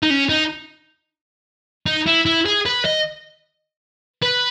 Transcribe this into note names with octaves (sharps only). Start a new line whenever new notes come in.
D#4
C#4
D#4
D#4
E4
E4
G#4
B4
D#5
B4